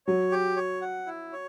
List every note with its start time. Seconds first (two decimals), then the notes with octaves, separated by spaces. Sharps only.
0.07 F#3 C#5
0.31 G4
0.56 C#5
0.82 F#5
1.06 E4
1.33 C#5